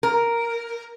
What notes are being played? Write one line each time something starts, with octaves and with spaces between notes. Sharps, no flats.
A#4